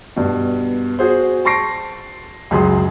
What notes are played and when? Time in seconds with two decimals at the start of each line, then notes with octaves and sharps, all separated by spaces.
0.16 G2 B2
0.99 F#4 G#4 C5
1.45 A5 C6 C#6 A#6 C7 D7
2.51 C#2 F#2 G#4 C6